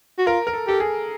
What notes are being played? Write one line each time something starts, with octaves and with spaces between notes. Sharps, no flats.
F#4
F4 A#4
A#4
A4
G4 A4
G#4